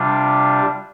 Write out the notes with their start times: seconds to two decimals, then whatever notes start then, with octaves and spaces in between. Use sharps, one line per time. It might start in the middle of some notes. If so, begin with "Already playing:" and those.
Already playing: C3 G3 D4 F4